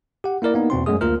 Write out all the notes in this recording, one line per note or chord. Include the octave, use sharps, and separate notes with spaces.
G4 F#5
A#3 E4 A#4 D5
A#3 B3 D#4
E2 B2 C4 C6
F#2 G#3 A3 G#4 D#6
D2 A#3 F4 A#4 F6